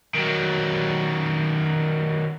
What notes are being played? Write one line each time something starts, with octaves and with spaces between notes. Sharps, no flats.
D#3 F#3